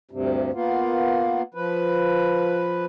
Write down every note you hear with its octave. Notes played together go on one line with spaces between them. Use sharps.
D2 G2 C3
A#3 B3 F4
F3 B4